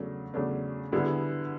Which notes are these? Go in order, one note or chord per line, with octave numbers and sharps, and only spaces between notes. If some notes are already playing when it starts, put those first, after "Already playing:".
Already playing: E2 C#3 F#3 A3 D4
E2 C#3 F#3 A3 D4
D3 G3 B3 E4 G#4